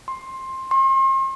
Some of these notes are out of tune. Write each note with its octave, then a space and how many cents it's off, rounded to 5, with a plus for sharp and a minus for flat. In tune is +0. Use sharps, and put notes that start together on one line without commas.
C6 +15
C6 +40